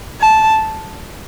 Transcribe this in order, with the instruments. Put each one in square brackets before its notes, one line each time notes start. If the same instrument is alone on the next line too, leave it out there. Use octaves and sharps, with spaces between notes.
[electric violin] A5